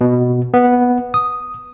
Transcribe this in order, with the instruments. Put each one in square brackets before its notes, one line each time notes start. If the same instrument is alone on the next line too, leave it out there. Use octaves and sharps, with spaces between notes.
[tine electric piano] B2
B3
D#6